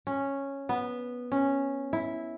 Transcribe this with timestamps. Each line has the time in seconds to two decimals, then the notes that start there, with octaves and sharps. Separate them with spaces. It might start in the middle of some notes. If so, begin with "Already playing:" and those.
0.07 C#4
0.69 B3
1.32 C#4
1.93 E4